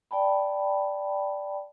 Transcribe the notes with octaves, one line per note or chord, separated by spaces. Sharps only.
D5 G5 A5 B5